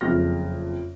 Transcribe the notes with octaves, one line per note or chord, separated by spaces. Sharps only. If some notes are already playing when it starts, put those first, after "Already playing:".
F#1 F2 F6 A#6